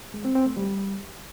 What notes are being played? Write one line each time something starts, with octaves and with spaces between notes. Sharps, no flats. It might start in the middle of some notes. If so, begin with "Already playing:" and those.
G#3
C4
C4
A3
G3